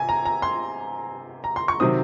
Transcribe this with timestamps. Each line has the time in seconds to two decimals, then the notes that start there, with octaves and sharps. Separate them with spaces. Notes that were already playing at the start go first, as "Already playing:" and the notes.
Already playing: C3 G#5
0.09 A#5
0.25 A#5
0.42 C6
1.44 A#5
1.56 C6
1.68 C#6
1.80 C3 D#3 F#3 C4 D#6